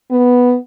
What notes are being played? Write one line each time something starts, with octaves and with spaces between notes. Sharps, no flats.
B3